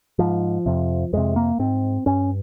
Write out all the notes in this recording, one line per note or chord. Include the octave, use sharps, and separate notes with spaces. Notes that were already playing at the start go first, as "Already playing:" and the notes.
G#2 F3
F2 C3
F2 C3 G#3
A#3
G#2 C4
G2 C#4